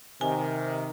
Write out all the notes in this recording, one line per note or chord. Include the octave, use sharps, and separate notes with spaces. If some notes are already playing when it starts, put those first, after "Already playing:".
C3 D#3 G#5